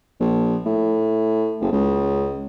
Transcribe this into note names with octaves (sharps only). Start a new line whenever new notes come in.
A#1
A2
F#1
C#2